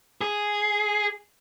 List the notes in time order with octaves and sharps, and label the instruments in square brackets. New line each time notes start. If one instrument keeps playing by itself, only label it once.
[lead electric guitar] G#4